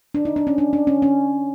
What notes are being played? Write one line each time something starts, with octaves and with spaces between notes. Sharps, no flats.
D4
D#4
D4
C#4
D4
D4
C#4
C#4